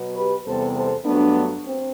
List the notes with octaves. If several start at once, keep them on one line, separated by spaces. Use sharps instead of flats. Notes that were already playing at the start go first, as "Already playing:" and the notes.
Already playing: B2 F#3 B3
G4 B4
E2 C3 G3 B3 A4 C5
A4 C5
G2 F#3 A3 B3 D4
C4